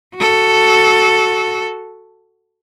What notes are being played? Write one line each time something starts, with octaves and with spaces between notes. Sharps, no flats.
F#4 A4